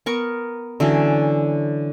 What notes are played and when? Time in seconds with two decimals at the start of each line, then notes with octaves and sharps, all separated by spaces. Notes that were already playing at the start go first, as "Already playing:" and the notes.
0.06 B3 A#4 C#6
0.80 D3 E3 F#3 C#4